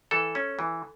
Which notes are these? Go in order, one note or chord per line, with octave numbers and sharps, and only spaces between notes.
E3 A4
C#4
E3